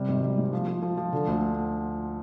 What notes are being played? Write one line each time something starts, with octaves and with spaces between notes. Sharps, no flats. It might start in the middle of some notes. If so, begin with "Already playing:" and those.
Already playing: C3 G3
G#1
G3
G#2
F3
F3
F3
F3
D3
D2